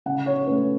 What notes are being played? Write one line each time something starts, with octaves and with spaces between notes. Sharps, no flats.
C#3 F#5
C#5
A3 C#4 B4